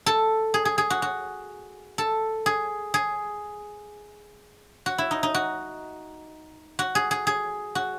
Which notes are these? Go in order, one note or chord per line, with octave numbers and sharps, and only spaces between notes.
A4
G#4
G#4
G#4
F#4
F#4
A4
G#4
G#4
F#4
E4
D#4
D#4
F#4
F#4
G#4
G#4
G#4
F#4